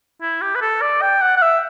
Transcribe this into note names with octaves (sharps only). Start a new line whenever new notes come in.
E4
G4
B4
A4
D5
G5
F#5
F#5
E5